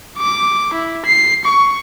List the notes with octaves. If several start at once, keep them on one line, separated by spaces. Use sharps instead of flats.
D6
E4
C7
C#6